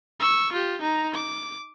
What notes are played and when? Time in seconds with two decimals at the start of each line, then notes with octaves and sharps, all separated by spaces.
0.20 C#6 E6
0.52 F4 G4
0.81 D#4 A#5
1.14 D6